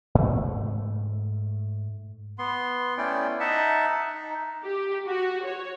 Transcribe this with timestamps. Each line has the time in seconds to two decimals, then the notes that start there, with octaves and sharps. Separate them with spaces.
0.15 G#2 A3
2.38 B3 C6
2.98 A3 B3 C#4 E4 D5 G5
3.40 D#4 D#5 E5 F#5 A5
4.14 D#4
4.63 G4
5.07 F#4
5.45 C#5